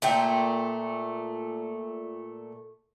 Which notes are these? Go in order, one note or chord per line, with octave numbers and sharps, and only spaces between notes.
A#2 A3 G5